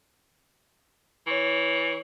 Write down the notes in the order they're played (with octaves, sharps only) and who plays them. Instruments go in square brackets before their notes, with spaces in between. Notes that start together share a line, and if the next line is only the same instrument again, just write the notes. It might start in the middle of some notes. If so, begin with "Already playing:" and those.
[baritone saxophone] E3 [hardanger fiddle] C#5